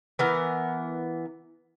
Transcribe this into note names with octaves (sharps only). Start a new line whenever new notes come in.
E3 B3 A#4